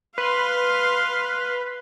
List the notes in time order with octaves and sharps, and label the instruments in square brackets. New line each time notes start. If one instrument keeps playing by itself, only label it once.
[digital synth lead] B4 [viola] F5 C6